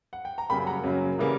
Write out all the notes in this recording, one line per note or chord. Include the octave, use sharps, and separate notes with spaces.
F#5
G5
A#5
F#2 C#3 G3 A#3 G5 B5
F#5 A#5
F#2 C#3 F#3 A#3
C#3 E3 G3 A#3